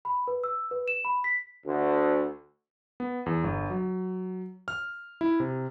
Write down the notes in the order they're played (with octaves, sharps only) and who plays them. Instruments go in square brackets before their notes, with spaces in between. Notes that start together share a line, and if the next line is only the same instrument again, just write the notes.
[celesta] B5
B4
E6
B4
E7
B5
B6
[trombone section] D2
[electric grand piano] B3
E2
G1
F#3
F6
E4
C3